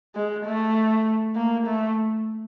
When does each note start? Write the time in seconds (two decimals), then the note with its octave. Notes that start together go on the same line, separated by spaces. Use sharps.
0.15 G#3
0.45 A3
1.36 A#3
1.67 A3